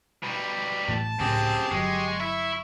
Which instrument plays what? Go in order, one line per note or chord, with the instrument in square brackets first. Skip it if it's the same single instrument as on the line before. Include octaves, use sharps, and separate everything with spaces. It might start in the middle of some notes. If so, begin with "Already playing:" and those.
[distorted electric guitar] B2 G3 [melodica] A#5
[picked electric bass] A2 E3 A3 [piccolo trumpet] A5
[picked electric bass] C#2 A2 [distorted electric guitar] F#2 C4 [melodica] G4 G#4
[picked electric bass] G1 F#3 [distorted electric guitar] G#3 [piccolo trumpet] C#6
[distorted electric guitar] E4 [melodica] E5 B5